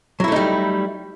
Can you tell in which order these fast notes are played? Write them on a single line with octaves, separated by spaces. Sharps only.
F#3 E4 A3 D#4 G3